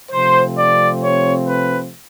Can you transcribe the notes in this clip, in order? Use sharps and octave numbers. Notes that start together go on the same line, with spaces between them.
C3 F3 A3 C4 C5
D5
C#5
B4